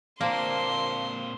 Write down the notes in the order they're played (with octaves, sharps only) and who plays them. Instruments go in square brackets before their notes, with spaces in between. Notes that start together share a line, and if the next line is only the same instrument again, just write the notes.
[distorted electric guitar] A#2 C4 [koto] A#3 [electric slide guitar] D4 C5 [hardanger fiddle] C6